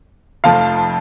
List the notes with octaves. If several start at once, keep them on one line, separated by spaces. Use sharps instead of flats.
F1 F2 F3 A3 F5 A5